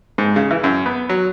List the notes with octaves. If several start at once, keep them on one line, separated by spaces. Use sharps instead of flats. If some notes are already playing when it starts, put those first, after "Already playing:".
G#2
C#3
E3
F#2
B3
F#3